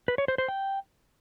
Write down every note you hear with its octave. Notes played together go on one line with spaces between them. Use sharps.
B4
C#5
C5
C5
G5